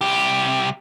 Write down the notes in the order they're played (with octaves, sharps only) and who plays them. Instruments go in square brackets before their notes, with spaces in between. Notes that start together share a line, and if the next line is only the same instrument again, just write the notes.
[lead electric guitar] C2 G4